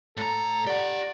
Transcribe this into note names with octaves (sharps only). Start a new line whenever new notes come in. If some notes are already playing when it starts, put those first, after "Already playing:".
A2 A4 A#5
G4 D5 F#5